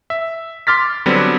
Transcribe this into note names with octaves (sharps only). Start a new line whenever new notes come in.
E5
C6 D6 F6 A6 B6
D3 F#3 G3 B3 C4